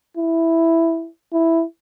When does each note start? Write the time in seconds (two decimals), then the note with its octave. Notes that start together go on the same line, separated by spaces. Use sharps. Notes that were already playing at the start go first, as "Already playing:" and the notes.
0.17 E4
1.33 E4